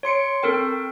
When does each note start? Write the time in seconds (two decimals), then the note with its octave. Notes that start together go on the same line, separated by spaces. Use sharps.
0.03 C#5 C6 C#7 D7
0.43 C4 A4 A#4 G5